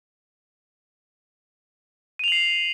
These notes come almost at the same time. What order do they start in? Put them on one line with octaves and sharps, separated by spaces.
D#7 F7 F#7 C7